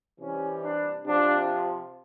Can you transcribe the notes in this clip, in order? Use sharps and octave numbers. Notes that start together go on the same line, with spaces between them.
C3 E3 G3 C#4
D4
C3 F3 D4